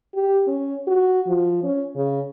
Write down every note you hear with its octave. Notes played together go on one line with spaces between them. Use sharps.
G4
C#4
F#4
F3
C#4
C#3